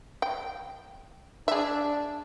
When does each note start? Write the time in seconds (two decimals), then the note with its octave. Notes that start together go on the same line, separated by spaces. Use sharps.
0.22 G5
1.48 D4 G#4 E5